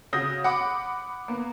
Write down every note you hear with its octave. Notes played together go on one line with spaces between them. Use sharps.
C#3 F#4 D#6 G6 A#6
F#5 B5 D6 D#6
A#3 B3